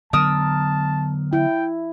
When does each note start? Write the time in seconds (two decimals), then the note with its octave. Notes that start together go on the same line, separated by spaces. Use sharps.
0.13 D3 F#3 B3 A#4 A5 D#6 E6
1.33 E4 G5